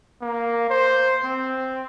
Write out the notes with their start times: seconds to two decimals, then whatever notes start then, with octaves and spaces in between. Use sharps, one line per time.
0.22 A#3
0.70 C5
1.24 C4